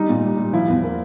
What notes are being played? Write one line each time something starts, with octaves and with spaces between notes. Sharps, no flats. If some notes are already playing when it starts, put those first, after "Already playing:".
Already playing: G3 D#4
A#2
G3
G3
F3 E4
E2
A#3